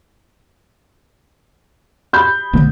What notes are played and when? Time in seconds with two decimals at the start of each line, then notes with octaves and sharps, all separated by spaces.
2.13 B5 G6
2.53 B1 D3 A3